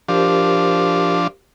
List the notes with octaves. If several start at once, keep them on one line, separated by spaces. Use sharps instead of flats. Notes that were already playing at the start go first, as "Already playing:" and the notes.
F3 D4 G4 A#4 C5